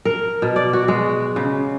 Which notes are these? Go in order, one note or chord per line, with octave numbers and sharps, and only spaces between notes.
A#4
B2
D5
F#4
G#3
C#3